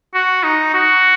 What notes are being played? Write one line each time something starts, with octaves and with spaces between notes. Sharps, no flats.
F#4
D#4
F#4